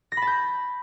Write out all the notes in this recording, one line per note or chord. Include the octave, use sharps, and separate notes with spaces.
A#6
B5
A5
G6